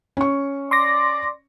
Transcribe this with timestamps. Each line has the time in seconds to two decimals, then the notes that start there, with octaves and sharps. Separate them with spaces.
0.17 C#4 C#6
0.71 D5 C6 D6 A#6